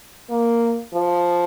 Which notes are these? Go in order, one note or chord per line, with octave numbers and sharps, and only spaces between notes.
A#3
F3